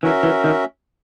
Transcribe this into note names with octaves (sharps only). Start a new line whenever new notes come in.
E3 C#4 F#4 A#4 E5
E3
D#3